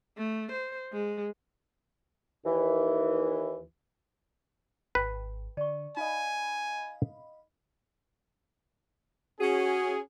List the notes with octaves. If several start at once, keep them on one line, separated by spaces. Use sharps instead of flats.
A3
C5
G#3
D#2 E3
G#1 B4 G5
D3 D5 C#6
D#4 D#5 F5 G#5 B5
C#4 F#4 G#4